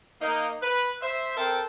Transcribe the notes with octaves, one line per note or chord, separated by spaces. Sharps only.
A#3 D#4
B4
C5 E5
C4 A4 A#4 C5 G5 A5